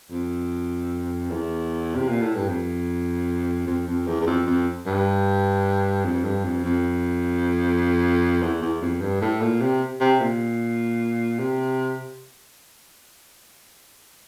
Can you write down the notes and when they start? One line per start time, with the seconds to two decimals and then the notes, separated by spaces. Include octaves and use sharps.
0.11 F2
1.30 E2
1.95 C3
2.09 A#2
2.22 A2
2.35 G2
2.49 F2
3.67 F2
3.87 F2
4.07 E2
4.21 E2
4.27 F2
4.47 F2
4.86 G2
6.05 F2
6.24 G2
6.45 F2
6.64 F2
8.42 E2
8.62 E2
8.82 F2
9.02 G2
9.22 A2
9.41 A#2
9.61 C3
10.01 C3
10.21 A#2
11.39 C3